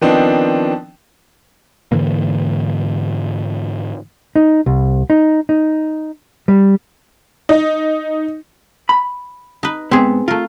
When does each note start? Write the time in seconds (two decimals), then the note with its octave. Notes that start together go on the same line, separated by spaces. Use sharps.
0.01 D#3 F3 B3 C4 D4 D#4
1.92 G#2 D3 E3 A#3
4.36 D#4
4.66 C2
5.10 D#4
5.49 D#4
6.48 G3
7.49 D#4
8.89 B5
9.63 D#4 B4
9.91 G#2 B3 C4 G#4
10.28 A3 F4 A#4